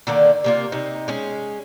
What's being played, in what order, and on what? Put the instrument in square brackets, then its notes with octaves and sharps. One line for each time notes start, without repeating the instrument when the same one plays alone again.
[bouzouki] D3 D#3 A#3 D4
C3 A#3 F4
C3 D#4
G#3 C#4